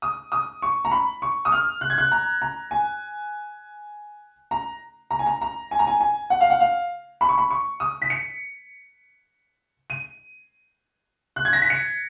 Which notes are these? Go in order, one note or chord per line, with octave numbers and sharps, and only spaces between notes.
D#6
D#6
C#6
A#5
B5
C#6
D#6
F6
F#6
G#6
F#6
A#5
A#5
G#5
A#5
A#5
G#5
A#5
A#5
G#5
A#5
G#5
G#5
F#5
F5
F#5
F5
B5
C#6
B5
C#6
D#6
B6
C#7
D#7
F#6
G#6
A#6
B6
C#7